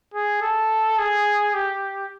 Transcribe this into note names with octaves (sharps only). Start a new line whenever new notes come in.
G#4
A4
G#4
G4